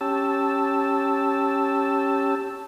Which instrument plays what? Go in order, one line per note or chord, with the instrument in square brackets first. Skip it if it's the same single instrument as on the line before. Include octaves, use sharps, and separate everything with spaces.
[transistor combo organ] C#4 G4 A5 E6